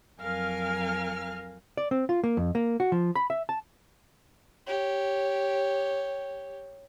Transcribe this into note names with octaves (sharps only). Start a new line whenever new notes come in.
F2 F#3 A#4 F5 G#5 F6
D5
C4
F4
A#3
F2
A#3
F#4
F3
B5
E5
A5
G4 C#5